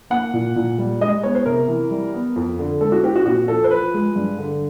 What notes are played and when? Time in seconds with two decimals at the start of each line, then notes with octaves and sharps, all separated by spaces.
0.10 A#3 F#5
0.34 A#2
0.56 A#2
0.78 G3
1.01 G#3 D#5
1.23 B3 C#5
1.35 C5
1.46 C3 A#4
1.68 E3
1.91 G3
2.14 B3
2.36 F2
2.59 D3
2.81 G#3 A4
2.92 F#4
3.03 C4 G4
3.16 F#4
3.26 A#2 F#4
3.48 F3 A4
3.64 C5
3.71 F3 B4
3.94 G#3
4.16 G2
4.39 D3